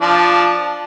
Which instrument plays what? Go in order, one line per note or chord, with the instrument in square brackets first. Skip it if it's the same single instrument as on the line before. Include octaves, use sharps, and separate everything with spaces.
[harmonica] F3 D4